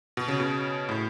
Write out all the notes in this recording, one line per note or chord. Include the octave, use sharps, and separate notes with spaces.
B2
C#3
B2
A2